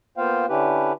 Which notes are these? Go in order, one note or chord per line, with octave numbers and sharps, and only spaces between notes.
A#3 B3 F4 C5 F5 G5
D3 C#4 D4 E4 G4 B4